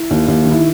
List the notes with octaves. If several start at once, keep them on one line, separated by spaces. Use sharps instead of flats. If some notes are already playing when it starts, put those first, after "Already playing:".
Already playing: E4
D#2
D#2
D#3
E4